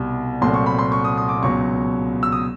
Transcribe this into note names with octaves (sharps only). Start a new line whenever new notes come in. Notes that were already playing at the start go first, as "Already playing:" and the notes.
Already playing: C2 B2 G3
C2 A#2 F#3 A3 C4 C6
C#6
B5
C6
C#6
D#6
D#6
D6
C#2 B2 F#3 C#6
E6
D#6